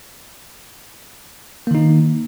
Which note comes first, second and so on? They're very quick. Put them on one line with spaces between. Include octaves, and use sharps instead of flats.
A#3 D#3 D#4